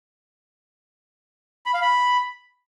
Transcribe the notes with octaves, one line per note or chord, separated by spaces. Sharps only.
B5
F5
B5